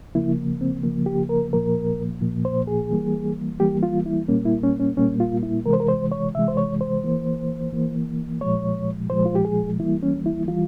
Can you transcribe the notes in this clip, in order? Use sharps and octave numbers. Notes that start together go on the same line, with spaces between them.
C#3 F3 A#3 E4
C4
C#3 F3 A#3
G4
A#4
A#2 F3 A#3 A#4
A#2 F3 A#3
C5
G#4
E3 G3 A#3
E3 G3 A#3 G4
F4
E4
A#2 G3 A#3 C#4
E4
C#4
C#4
A#2 G3 A#3 C#4
F4
E4
C3 E3 G#3 A#4
C5
A#4
C5
C#5
C3 E3 G#3 E5
C5
C#5
C5
E3 A#3
E3 A#3
A#2 F3 G#3 C#5
A#2 F3 G#3 C5
F4
G4
G#4
E3 G3 A#3 E4
C#4
E4
E3 G3 F4